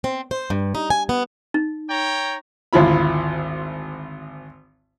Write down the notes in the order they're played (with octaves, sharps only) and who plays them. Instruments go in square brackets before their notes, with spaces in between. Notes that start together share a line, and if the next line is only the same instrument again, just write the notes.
[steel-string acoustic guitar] C4
C5
G2
D#4
G#5
B3
[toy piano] D#4
[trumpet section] C#5 G5 A#5
[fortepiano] G#1 D2 E4 F4 B5